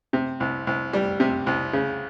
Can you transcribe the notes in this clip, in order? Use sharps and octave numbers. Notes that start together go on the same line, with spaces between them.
C3
C2
C2
G3
C3
C2
C#3